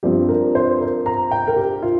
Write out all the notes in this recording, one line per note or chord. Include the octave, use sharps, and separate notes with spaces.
G2 F3 C4 G4
A#4
C5
A#4
A#5
G5
A#4
G4
F4